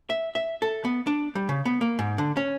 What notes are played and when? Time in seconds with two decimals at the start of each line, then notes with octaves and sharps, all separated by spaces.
0.10 E5
0.35 E5
0.62 A4
0.85 B3
1.07 D4
1.35 G3
1.49 C#3
1.65 B3
1.81 A#3
1.99 G#2
2.18 D3
2.37 C#4